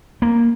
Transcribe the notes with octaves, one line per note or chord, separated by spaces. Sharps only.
A#3